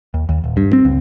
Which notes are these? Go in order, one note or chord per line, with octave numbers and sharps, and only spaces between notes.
D#2
D#2
D#1
G2
C4
C#2